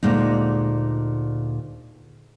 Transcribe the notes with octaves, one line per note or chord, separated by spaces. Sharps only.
D2 A#2 G#3 D#4